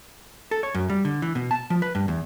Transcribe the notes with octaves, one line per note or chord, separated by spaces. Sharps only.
A4
C#5
F#2
G3
D3
E3
B2
A5
F3
B4
G2
E2